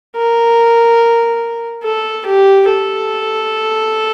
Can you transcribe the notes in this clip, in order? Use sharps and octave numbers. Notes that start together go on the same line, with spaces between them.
A#4
A4
G4
A4